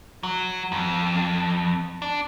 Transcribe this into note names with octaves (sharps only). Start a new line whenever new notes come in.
F#3
F2
D4